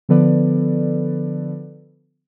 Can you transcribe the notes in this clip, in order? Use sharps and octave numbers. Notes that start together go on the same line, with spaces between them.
D3 F3 B3 A4 B4 D5